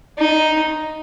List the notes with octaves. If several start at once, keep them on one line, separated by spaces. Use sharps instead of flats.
D#4